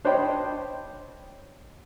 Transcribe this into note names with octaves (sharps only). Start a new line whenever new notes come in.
D4 C5 C#5 D#5 G5 B5